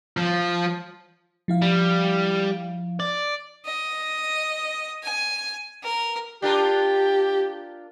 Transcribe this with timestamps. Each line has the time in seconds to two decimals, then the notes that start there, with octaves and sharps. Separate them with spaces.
0.17 F3
1.48 F3 E4 F5
1.62 G3
3.00 D5
3.65 D#5
5.03 G#5
5.83 A#4
6.42 D4 F4 G4 A#4